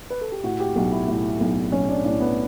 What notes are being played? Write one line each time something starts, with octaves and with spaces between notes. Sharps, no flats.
B4
A4
G4
A2 F#4
G4
B1 F#4
E4
A2
B1
B1 C#4
D4
A2 D4
B3